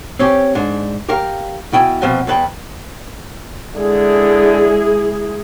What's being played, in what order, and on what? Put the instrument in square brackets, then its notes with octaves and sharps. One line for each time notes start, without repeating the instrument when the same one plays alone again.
[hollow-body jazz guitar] C4 C#4 G4
G#2 D4
G4 A#4 F5
B2 E4 G5 G#5
B2 F3 C4 F#4
E2 B4 G5
[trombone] D3 [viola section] G#3 E4 G#4